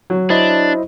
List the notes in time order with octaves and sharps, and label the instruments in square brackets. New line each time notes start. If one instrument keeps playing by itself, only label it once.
[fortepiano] F#3
[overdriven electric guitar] D4 [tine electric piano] E4 C5 D#5